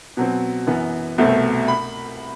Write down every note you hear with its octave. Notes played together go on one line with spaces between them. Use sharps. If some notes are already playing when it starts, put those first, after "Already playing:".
B2 F#3 C4
F#2 E3 B3
C2 B2 A3 C4
B5